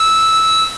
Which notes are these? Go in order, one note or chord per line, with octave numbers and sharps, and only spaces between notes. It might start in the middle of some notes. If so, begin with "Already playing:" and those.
Already playing: E6